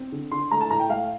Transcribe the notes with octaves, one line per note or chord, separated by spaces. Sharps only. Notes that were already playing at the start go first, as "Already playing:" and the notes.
Already playing: C4
D3
D3 C6
A3 A#5
A5
A2 A#5
G5
A3 F5